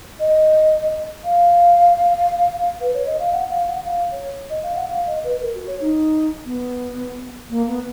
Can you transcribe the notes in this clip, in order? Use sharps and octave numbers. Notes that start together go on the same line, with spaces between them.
D#5
F5
B4
C#5
D#5
F5
F#5
F5
F#5
F5
C#5
D#5
F5
F#5
F5
D#5
B4
A#4
F#4
C#5
D#4
B3
A#3
B3